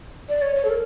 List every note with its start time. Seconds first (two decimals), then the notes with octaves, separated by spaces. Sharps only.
0.29 D5
0.42 C#5
0.56 C#5
0.65 A4
0.70 A#4